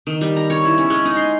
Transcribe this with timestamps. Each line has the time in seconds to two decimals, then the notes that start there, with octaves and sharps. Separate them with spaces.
0.07 D#3
0.21 G3
0.37 A#5
0.50 C#5
0.65 E4
0.78 C#4
0.90 G#3
1.05 D#4
1.17 C6